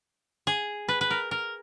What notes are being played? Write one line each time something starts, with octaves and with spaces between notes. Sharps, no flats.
G#4
B4
B4
A#4
A#4